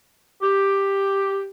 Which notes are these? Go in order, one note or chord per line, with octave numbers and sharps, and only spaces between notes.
G4